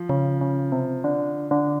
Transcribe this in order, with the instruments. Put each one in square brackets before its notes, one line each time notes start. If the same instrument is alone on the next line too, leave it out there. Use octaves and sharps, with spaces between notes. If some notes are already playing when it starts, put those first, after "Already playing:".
Already playing: [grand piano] F3
[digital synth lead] C#3
C#3
C3
D3
D3